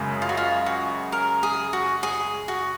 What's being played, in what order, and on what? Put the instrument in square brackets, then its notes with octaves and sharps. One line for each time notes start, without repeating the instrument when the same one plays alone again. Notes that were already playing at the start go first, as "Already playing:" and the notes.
Already playing: [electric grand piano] F#2 C#3 G#3
[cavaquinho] F4
F#4
F4
F#4
A#4
G#4
F#4
G#4
F#4